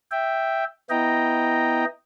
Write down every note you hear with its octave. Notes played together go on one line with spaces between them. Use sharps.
E5 G5
B3 E4 D#5 G5 A#5